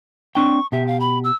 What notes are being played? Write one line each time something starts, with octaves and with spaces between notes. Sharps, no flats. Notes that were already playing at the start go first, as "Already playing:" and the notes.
C4 D4 G5 C#6
B2 G4 E5
F5
B5
E6